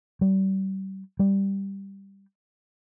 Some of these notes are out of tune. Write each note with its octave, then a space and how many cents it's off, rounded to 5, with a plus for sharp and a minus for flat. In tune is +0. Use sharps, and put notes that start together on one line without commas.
G3 -35
G3 +5